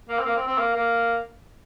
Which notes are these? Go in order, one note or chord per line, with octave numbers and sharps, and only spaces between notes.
A#3
C4
A#3
C4
C4
A#3
A#3